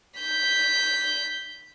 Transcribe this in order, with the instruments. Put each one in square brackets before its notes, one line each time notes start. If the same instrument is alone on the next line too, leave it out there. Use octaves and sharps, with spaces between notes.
[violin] G6 B6